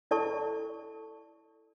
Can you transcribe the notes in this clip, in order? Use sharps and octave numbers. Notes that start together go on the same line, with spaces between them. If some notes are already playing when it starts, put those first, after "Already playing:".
E4 A4 D5 A5 C#6